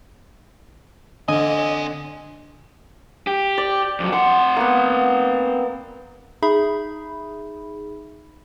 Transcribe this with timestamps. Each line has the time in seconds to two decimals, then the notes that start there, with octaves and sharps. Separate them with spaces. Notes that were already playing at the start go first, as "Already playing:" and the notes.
1.28 D3 C4 D#5 G#5
3.27 G4
3.58 D5
4.00 F2 F#3
4.13 C4 F#5 C6
4.57 A#3 B3
6.42 D#4 G#4 E5 B5